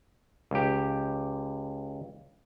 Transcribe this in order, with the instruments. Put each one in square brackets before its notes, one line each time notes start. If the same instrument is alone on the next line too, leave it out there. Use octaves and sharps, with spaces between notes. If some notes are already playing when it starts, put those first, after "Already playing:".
[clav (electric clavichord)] C#2 G4